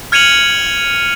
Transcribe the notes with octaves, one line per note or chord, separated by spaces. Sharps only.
F6 G#6 C#7 D#7 F7 F#7